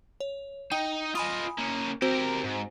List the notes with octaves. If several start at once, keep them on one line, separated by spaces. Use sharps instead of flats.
C#5
D#4 G5
F4 D#5 G#5 B5 D#6
A#3 C#4
C4 F#4 G4 A#4 C5
G#2